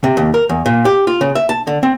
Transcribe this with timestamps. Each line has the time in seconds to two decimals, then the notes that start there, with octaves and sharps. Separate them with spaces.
0.04 C3
0.17 D#2
0.34 A#4
0.49 E2
0.66 A#2
0.85 G4
1.07 F4
1.21 C#3
1.35 E5
1.49 A5
1.67 D3
1.83 C4